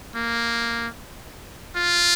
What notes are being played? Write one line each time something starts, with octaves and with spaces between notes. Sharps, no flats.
A#3
F4